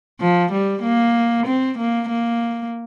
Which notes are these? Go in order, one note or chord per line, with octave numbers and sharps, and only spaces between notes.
F3
G3
A#3
C4
A#3
A#3